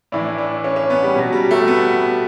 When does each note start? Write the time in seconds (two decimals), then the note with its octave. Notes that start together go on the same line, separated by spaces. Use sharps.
0.12 A2 E3 D4
0.38 D4
0.64 C#4
0.76 C#4
0.90 B3
1.03 G3
1.15 B2 F#3
1.33 G3
1.51 A3
1.68 B3